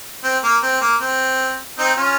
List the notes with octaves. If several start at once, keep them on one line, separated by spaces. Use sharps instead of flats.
C4
A#3
C4
A#3
C4
C4 D#4
C#4 F4